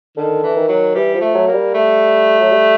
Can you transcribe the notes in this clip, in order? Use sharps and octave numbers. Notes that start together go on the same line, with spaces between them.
D3 D#3
E3
D#3
F#3
E3 G3
F3
A3
F#3
A#3
G3
A3
F#3
G3